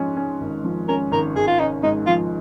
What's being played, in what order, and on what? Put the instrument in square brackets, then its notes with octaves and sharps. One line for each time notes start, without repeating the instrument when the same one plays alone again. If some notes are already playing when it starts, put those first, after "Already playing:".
Already playing: [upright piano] G#2 F3 C#4
C#4
G#1
F3
[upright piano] C#4 [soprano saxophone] A#4
[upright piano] G#1 [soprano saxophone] A#4
[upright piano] G#1 [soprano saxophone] G#4
[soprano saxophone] F4
[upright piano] C#4 [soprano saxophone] D#4
[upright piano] G#2 [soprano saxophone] D#4
[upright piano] F3 [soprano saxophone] F4